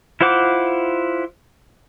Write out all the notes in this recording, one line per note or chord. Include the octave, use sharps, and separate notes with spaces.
E4 F4 C5 F#5 D6